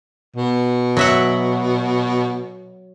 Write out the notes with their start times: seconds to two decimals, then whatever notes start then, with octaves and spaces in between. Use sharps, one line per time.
0.36 B2
0.97 F#3 E5 F#5